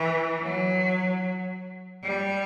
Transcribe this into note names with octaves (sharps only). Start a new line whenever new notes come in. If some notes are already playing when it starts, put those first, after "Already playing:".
Already playing: E3
F#3
G3